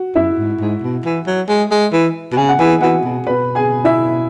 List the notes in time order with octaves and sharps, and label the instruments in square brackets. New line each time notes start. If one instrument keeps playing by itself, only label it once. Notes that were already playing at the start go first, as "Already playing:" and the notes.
Already playing: [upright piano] F#4
[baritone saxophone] F#2 [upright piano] E4 E5
[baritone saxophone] G#2
G#2
B2
E3
F#3
G#3
G#3
E3
B2
[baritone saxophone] C#3 [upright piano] G#5
[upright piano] F#5
[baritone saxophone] E3 [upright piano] G#4 G#5
[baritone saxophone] E3 [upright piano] F#4 F#5
[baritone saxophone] B2
[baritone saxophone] B2 [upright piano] B4 B5
[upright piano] G#4 G#5
E4 E5